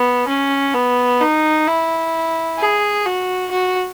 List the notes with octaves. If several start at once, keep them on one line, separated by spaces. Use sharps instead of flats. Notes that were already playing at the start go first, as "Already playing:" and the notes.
Already playing: B3
C#4
B3
D#4
E4
G#4
F#4
F#4